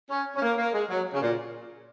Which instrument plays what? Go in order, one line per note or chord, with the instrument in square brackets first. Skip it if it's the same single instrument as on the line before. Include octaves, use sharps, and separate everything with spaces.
[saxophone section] C#4
C#4
A#3
A#3
G#3
F#3
C#3
A#2